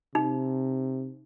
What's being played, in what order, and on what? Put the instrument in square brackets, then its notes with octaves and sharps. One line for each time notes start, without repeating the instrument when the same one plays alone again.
[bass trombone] C3 [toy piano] D#4